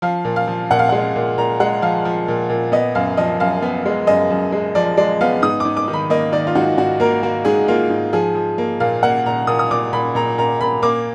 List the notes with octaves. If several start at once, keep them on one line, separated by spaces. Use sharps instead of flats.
F3 F5
A#2
F5
F3
A#2 F#5
F5
G#3 F#5
A#2
A#2 A#5
G#3 F#5
F3 F5
F3
A#2
A#2
B3 D#5
F#2 F5
F3 D#5
F#2 F5
B3
G#3
F#2 D#5
F#2
G#3
F3 D5
G#3 D5
B3 F5
G#2 D#6
G#2 D6
D6
D#3
B5
A#3 D#5
D#3 D5
F4
G#2 F#4
G#2 F#4
A#3 A#4
A#3 F#4
G#2 G#4
A#3 F4
G#2
F3 G#4
F3
A#3
A#2 F5
A#3 F#5
A#2 A#5
A#2 D#6
D#6
A#2 D6
A#2 B5
A#2 A#5
A#2 A#5
A#2 B5
A#3 D6